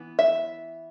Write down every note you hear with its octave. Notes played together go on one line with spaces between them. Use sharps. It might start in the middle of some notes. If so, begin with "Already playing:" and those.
Already playing: E3 B3
E5